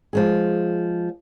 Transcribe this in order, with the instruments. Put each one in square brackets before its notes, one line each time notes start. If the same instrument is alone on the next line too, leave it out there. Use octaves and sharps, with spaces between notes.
[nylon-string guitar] F3 G#3 G#4